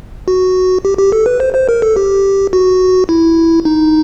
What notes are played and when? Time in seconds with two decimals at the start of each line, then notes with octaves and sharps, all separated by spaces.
0.28 F#4
0.85 G4
0.98 G4
1.12 A4
1.26 B4
1.40 C5
1.55 C5
1.69 A#4
1.82 A4
1.96 G4
2.53 F#4
3.09 E4
3.65 D#4